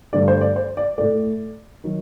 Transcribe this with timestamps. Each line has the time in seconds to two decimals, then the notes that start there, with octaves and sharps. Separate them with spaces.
0.13 G2 D3 A3 D5
0.28 C5
0.41 D5
0.56 C5
0.77 D5
0.98 A2 A3 D5
1.84 D#3 F#3